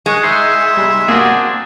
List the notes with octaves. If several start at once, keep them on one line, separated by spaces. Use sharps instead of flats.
G#3 C#6
D#4 C5 E5
G3
A#3 C4 D4 F#4 G#4